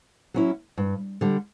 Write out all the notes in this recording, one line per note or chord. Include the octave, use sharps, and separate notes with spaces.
F#3 C#4 E4
G2
D3 G3